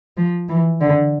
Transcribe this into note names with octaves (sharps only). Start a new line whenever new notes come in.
F3
E3
D3